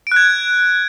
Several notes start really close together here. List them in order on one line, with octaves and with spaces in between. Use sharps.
D7 F#6 G#6